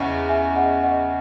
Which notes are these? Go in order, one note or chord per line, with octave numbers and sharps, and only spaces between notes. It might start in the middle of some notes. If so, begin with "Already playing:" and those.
Already playing: E2 C#3 C#4 D#5 F#5
E5 G#5
D#5 F#5
D#5 F#5